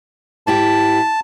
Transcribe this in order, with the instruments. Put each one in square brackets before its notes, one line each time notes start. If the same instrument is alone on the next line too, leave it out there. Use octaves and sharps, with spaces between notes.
[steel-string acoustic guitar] G#2 E4 G4 [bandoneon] A5